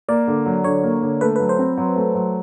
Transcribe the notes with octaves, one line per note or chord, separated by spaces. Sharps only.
A#3 D5
D3
F#3
D3 C#5
A#3
D3
A3 B4
B4
F#3
C5
C4
F#3
A3
F#3